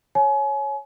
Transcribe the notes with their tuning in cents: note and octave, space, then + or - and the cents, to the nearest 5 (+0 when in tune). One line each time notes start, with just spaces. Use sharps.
C#5 -10 G#5 +35